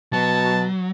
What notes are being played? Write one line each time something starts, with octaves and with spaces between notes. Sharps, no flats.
B2 F#3 A5